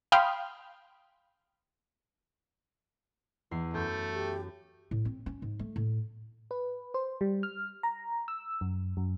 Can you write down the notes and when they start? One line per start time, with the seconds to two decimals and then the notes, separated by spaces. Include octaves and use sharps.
0.12 F5 G5 B5 C6 D#6 F6
3.51 E2 C7
3.74 F#2 A3 G6
4.13 G4
4.91 A2
5.05 C4
5.26 C#4
5.42 G#2
5.59 A3
5.76 A2
6.51 B4
6.94 C5
7.21 G3
7.43 F6
7.83 A#5
8.28 E6
8.61 F#2
8.97 F#2